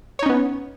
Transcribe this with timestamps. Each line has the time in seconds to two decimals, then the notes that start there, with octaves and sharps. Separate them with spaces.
0.19 C#5
0.23 D#4
0.26 C#4
0.29 B3